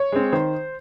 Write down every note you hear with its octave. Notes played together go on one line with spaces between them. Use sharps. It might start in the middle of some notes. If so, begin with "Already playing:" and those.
Already playing: C#5
G#3 C4
D#3 C5